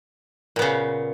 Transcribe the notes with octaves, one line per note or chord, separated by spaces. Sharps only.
A#2 C#3 B3